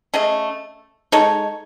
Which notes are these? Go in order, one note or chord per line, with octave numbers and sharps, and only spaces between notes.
A3 C#4 G#4 D#5
G#3 D#4 A4 C#5